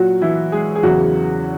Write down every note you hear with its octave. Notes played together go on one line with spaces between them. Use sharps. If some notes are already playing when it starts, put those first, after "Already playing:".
Already playing: A#2 F#3 F#4
E3 E4
G#3 G#4
G#4
E2 C#3 E3 F#3 F#4